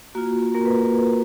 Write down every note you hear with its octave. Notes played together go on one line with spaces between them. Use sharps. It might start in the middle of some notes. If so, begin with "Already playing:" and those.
A#3 F4 F#4
A#3 A#4
B4